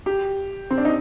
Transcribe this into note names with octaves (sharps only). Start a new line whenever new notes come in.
G4
C4
D4
D#4